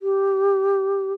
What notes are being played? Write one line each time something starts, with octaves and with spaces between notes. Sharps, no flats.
G4